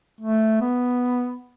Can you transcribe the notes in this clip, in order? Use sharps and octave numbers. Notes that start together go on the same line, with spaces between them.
A3
B3